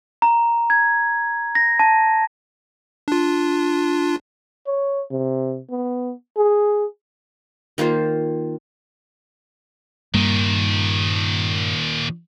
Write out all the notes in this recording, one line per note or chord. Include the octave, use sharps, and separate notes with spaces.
A#5
G#6
A#6
A5
D4 F4
C#5
C3
B3
G#4
D#3 A#3 F4 C5
G2 A#2 D#3 G3 A#3